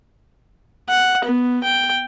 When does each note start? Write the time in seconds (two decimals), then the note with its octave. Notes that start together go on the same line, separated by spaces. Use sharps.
0.89 F#5
1.25 B3
1.64 G5